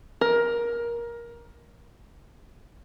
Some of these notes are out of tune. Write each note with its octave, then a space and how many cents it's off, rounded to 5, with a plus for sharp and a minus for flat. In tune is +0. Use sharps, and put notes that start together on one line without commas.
A#4 +15